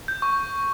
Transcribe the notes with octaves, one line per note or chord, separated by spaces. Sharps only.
G6
C#6